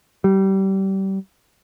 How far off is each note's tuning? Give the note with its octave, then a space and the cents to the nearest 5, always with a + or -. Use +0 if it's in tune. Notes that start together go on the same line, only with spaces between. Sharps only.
G3 -25